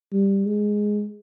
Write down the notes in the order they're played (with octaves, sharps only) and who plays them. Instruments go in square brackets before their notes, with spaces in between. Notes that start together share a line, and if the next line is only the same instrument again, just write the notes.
[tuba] G3
G#3